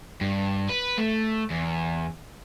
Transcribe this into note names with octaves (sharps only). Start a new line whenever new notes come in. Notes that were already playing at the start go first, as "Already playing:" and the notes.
G2
B4
A3
E2